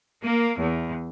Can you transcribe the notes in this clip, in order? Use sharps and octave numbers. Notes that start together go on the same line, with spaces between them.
A#3
E2